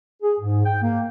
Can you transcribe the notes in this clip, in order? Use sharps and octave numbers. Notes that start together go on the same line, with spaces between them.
G#4
G#2
G5
A#3